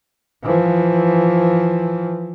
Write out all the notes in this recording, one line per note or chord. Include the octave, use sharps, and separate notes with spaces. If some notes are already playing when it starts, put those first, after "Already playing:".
E3 F3